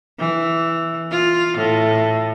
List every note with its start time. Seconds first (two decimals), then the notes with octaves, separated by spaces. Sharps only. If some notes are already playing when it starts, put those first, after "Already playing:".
0.19 E3
1.11 F4
1.57 A2